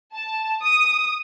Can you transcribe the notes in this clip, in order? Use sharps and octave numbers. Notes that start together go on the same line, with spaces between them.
A5
D#6